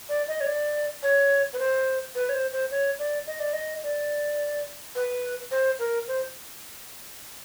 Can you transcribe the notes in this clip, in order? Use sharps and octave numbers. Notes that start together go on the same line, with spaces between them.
D5
D#5
C#5
D5
C#5
B4
C5
B4
C#5
C5
C5
C#5
D5
D#5
D5
D#5
D5
B4
C5
A#4
C5